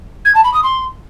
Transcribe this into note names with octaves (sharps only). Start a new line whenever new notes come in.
G#6
A5
B5
D#6
C6